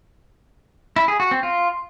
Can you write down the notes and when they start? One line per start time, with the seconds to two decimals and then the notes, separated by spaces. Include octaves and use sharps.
0.96 E4
1.08 G#4
1.20 F#4
1.31 C4
1.43 F4